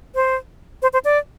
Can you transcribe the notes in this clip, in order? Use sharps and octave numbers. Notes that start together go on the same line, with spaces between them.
C5
C5
C5
D5